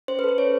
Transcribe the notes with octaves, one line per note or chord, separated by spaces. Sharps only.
C#4 C5
B4
A4 C5
C#4 C#5